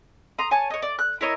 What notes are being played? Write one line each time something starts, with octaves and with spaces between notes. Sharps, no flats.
A#5 C6 D#6
C#5 G#5 A5
C#5 D#5
D5
F#6
E4 A#4 C#5 D#5